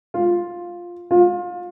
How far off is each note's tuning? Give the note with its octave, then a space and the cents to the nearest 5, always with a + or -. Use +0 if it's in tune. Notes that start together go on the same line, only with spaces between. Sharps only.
F4 +5
F4 +30